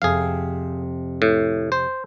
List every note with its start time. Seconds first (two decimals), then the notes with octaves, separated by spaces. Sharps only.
0.02 F2 C3 G#4 F5
1.22 A2
1.72 C5